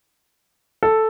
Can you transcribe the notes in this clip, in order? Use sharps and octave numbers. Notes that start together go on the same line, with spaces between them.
A4